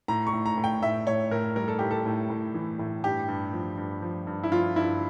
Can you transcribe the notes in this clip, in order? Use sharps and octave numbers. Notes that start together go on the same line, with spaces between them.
A2 A#5
C#6
A2
A#5
A2
G5
A2 E5
A2 C#5
A2 A#4
G3 A#4
A4
A2 G4
A4
A2
A2
E3
A2
G2 G4
G2
F3
G2
F3
G2
E4
F3 F4
G2 E4